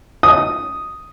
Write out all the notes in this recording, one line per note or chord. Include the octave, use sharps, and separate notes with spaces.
D#6